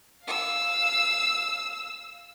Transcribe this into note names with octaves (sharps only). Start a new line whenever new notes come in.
F5 E6